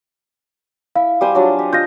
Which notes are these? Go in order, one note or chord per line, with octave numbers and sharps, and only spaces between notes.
E4 F5
G3 C5 G#5
F#3 D4 F4
G4
F4 D#5 G6 A#6